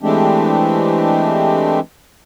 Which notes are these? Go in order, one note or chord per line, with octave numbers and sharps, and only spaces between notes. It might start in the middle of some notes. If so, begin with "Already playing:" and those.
E3 G#3 A3 C4 D4 G4